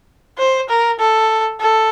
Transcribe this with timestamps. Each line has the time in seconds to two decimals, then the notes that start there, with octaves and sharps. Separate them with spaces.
0.38 C5
0.69 A#4
0.99 A4
1.61 A4